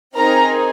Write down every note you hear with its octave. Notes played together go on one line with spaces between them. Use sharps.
C4 D#4 G#4 A#4 A#5